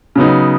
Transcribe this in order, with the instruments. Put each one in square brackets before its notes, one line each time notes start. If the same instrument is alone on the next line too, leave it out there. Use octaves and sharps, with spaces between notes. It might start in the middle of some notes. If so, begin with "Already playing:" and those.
[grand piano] C#3 F#3 B3 D#4